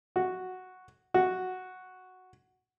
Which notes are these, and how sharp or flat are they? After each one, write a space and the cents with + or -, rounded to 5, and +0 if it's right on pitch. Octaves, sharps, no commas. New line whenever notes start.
F#4 +0
F#4 +0